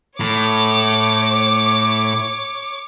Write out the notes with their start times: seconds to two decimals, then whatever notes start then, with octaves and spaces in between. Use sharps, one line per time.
0.20 A2 C#5 D6